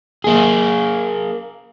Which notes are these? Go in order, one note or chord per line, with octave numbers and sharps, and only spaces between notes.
A#3 G#4